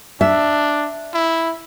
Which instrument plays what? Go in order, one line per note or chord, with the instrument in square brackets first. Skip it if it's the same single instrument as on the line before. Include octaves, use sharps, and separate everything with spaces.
[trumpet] D4 [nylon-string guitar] E5
[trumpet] E4